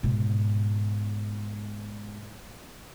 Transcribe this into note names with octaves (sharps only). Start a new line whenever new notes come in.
G#2 B2